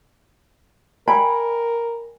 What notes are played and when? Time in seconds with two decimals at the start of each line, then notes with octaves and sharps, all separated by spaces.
1.08 A#4 D5 G5 G#5 B5